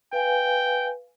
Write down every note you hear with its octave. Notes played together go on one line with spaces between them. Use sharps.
B4 F5 G5 G#5